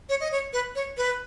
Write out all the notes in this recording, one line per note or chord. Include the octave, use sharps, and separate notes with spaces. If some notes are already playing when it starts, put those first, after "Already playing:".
C#5
D#5
C#5
B4
C#5
B4